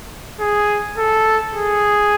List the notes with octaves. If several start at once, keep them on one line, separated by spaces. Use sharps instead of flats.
G#4
A4
G#4